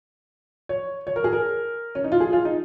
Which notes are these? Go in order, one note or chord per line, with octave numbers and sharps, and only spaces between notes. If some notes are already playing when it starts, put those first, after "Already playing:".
C#5
C#5
A#4
G#4
A#4
C#4
D#4
F4
G#4
F4
D#4